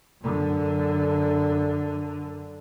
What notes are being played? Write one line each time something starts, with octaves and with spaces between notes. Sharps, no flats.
F#2 D3